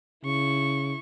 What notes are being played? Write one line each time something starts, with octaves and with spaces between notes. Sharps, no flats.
C#3 E4 C#6